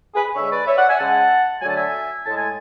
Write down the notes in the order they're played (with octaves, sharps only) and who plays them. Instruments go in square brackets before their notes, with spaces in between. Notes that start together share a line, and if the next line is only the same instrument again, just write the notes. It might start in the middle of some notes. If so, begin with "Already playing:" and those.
[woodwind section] G#4 B4
D3 G#3 C#5 E5
B4 D5
C#5 E5
D5 F#5
E5 G#5
C#3 G#3 F#5 A5
D3 F#3 A3 G#5
A5
E5 G#5
A2 G#3 A5
G#5